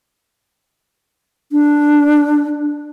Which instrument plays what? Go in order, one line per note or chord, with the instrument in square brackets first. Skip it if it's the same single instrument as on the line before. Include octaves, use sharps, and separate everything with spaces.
[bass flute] D4